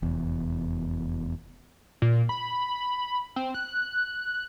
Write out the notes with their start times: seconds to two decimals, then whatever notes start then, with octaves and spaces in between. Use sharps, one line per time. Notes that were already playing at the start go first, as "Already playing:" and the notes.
0.02 F1 E2
2.02 A#2
2.29 B5
3.36 C4
3.54 F#6